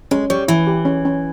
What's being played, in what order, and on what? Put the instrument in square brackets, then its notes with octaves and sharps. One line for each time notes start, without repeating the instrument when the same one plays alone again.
[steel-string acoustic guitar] G#3 [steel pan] C#4
[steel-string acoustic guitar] G3 [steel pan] C#5
[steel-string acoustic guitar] E3 [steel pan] E4
[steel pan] G4
C#4
C#4